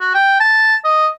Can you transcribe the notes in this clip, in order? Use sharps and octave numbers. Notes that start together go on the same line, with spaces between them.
F#4
G5
A5
D#5